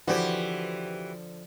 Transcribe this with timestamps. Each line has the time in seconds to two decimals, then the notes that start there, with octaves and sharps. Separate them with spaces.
0.08 D3 E3 F3 F#4 G4 C5